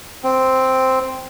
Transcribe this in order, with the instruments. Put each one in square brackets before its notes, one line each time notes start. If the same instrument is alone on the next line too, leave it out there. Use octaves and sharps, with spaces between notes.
[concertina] C4